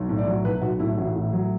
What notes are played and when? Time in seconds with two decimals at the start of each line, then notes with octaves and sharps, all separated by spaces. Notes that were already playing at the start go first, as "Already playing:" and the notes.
Already playing: B1
0.09 A2
0.18 D5
0.27 F#3
0.45 B1 B4
0.62 B1 F#4
0.79 A2 E4
0.97 A1 F#4
1.16 A2
1.33 F#3